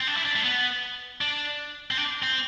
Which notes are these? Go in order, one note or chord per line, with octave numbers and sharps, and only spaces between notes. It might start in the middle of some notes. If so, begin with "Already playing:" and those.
C4
D4
E4
D4
A3
B3
D4
C4
D4
C4